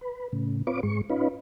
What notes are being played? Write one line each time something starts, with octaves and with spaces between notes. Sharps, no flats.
B4
A2 C#3
C4 F4 B4 C#5 D6
G#2 G#3 C#6
C#4 D#4 F4 B4